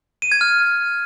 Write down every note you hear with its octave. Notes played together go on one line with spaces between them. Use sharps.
D#7
G#6
F6